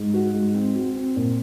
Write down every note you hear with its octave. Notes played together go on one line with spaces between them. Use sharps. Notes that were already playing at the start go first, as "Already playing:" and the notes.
Already playing: G#2
F#4
G#2
C4
F#4
C4
A#2